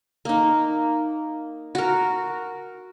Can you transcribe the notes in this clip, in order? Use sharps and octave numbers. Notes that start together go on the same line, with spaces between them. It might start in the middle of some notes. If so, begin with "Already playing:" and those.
A#3 D#4
F#4 A#4